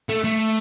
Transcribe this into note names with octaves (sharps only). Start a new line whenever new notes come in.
A3
A3